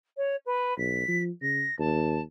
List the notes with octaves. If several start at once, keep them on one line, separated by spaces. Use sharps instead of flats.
C#5
B4
B1 B6
F3
C#3 A#6
D#2 A5